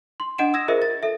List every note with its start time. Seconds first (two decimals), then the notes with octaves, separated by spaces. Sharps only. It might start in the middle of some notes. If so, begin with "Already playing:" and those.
0.20 C6
0.38 D4 D#5 F#5 D7 E7
0.54 D#6 E6 G#6 A#6 E7
0.68 F4 G#4 A#4 C5 D#5 E5
0.82 A6
1.03 A4 E5